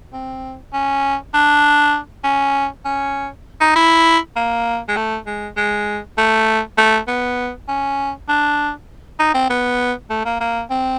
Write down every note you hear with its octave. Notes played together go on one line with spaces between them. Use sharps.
C4
C#4
D4
C#4
C#4
D#4
E4
A#3
G#3
A3
G#3
G#3
A3
A3
B3
C#4
D4
D#4
C4
B3
A3
A#3
A#3
C4